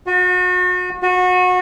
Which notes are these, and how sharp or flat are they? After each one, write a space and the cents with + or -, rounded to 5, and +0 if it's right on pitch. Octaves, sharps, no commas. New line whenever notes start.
F#4 -35
F#4 -25